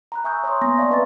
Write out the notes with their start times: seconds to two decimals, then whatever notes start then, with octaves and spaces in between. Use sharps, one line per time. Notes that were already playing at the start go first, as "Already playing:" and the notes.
0.12 A#5 B5 F#6
0.24 E5 G#5 C#6 D#6 E6 G6
0.43 C#5 A#5 C6 D#6
0.61 A#3 B3 G#5 C6 A#6
0.78 D5 E5 F5 A5 C#6
0.90 C4 B4 D#5 A#5 A6